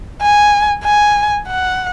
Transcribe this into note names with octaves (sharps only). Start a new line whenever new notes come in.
G#5
G#5
F#5